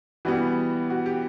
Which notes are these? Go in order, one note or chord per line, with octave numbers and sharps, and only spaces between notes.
E3 G3 B3 F#4
F#4
G4